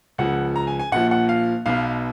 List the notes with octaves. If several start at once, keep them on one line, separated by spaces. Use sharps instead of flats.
C#2 C#3 F3 F#5
A#5
G#5
G#5
A#1 A#2 F3 F#5
F#5
F5
B1 B2 F5